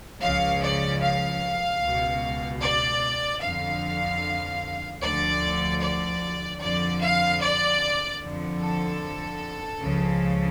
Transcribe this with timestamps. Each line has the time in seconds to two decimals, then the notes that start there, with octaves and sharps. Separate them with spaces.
0.22 C#2 C#3 F3 F5
0.62 D5
1.01 F5
1.82 C#2 B2
2.61 D5
3.41 F2 D3 F3 F5
5.02 D2 D3 F3 D5
5.81 D5
6.61 F2 D3 F3 D5
7.01 F5
7.41 D5
8.21 F2 D3 F3
8.61 A4
9.81 C#2 C#3 F3